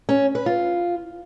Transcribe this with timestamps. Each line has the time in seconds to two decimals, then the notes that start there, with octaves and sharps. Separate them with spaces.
0.09 C#4
0.35 B4
0.46 F4